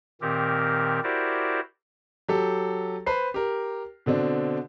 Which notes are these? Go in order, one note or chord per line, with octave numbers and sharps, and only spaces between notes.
A#2 D#3 C4 G4 A#4
E4 F#4 G4 A#4 C5 D5
F#3 G4 A4
B4 C5 C7
G4 A#4
B2 D3 C4 D4